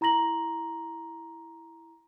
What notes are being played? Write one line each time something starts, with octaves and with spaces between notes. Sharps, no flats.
E4 A#5 C6 A#6 F#7